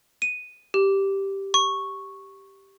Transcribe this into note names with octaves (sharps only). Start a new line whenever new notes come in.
D#7
G4
C#6